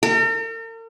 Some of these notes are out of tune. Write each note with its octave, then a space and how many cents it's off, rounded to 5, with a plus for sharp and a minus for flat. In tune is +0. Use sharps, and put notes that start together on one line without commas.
A#4 -45